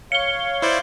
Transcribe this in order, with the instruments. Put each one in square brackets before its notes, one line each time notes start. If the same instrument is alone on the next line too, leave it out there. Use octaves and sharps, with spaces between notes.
[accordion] C#5 F5 [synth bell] C#7 G7
[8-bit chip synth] E4 C5 D5